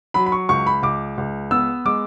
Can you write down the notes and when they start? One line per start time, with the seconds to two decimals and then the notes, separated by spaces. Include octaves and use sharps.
0.14 F#3 B5
0.26 B5
0.32 C#6
0.49 C#2 C#6
0.67 B5
0.83 C#2 D6
1.18 C#2
1.51 B3 E6
1.85 G#3 D6